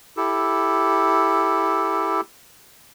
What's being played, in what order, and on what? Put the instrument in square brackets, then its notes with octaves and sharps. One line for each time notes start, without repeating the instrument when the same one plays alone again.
[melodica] E4 G4 A4